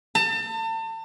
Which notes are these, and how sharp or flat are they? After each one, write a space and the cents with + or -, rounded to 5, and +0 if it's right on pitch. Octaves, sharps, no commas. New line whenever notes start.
A5 +35